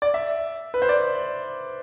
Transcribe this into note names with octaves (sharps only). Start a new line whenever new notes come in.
D5
E5
B4
C5
D5